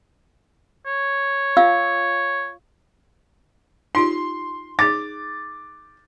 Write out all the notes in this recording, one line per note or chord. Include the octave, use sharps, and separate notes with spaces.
C#5
F4 F5 E6
D#4 F4 G4 C6
D#4 G#4 D6 A6